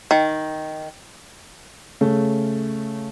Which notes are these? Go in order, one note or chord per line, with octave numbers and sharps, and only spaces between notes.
D#3
C#3 A3 C#4